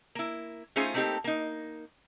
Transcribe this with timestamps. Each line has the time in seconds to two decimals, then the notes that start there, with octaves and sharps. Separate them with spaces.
0.15 A#3 E4
0.76 A3 C#4 D#4 F4 G#4 C5
0.94 A3 A#3 C4 D#4 G4 A4
1.24 A#3 D#4